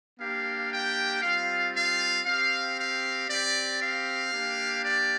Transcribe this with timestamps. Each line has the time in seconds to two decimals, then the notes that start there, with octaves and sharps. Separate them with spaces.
0.19 A#3 D4 G4 F5
0.71 G5
1.22 G3 C4 F4 F5
1.74 F5
2.25 C4 G4 F5
2.77 F5
3.28 C4 G4 D5
3.80 F5
4.32 A#3 D4 G4
4.83 D5